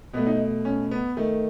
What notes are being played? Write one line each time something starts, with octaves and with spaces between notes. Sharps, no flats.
B2 A3 B3
D#4
C#4
B3
D#3 A3